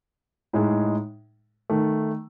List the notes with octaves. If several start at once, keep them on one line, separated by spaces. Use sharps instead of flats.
A2 G#3 D#4 G#4
D#3 A3